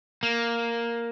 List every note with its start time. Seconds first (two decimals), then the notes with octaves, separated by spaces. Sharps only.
0.23 A#3